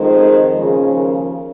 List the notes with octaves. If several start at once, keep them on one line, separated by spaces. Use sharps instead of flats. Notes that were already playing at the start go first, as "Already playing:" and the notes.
Already playing: F2 D#3 G#3 C5
D#2 C#3 F3 G#4
A#4